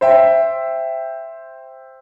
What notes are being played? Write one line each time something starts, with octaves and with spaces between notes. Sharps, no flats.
C5 E5 G5